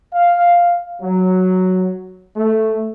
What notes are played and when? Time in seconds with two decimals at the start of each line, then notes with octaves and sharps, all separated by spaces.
0.13 F5
1.02 F#3
2.36 A3